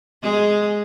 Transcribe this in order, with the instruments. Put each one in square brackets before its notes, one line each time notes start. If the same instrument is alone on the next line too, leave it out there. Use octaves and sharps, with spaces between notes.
[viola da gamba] G#3 G#4